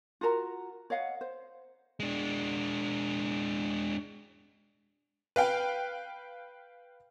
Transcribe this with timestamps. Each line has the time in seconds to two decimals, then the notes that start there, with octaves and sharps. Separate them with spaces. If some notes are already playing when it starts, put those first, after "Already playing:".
0.21 F4 F#4 A#4 A#5
0.90 C#5 D#5 F5 F#5
1.21 C5
2.00 G#3 D4
5.36 B4 F5 G5